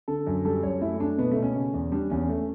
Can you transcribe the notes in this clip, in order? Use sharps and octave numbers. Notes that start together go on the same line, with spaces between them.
D3 A4
F#2
G3 A4
F#2 C#5
A3 E4
A3 D4
B2 B3
A3
B2
C#4
C#3
E2
G3 D4
E2 C#4
A3